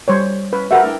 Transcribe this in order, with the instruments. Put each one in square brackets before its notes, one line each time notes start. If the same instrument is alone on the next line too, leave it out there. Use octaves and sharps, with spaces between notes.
[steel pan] G3 C5 C#5
[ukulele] C#4 [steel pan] B4
[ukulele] F#4 G4 F#5 [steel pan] A#4 B4 E5
[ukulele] D4 E4 G5